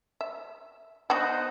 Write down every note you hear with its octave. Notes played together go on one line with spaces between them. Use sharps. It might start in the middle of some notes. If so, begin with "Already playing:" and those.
E5
B3 D4 D#4 F#4 C5 F#5